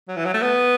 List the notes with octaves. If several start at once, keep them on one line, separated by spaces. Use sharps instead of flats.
F#3
E3
F#3
A3
B3